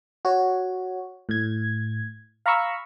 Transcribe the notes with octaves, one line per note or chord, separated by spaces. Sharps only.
F#4 C#5
A2 G#6
F5 A#5 B5 C#6 E6